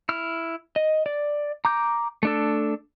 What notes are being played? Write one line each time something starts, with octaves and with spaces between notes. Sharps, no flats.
E4 F6
D#5
D5
A#5 D6 G6
A3 D4 A4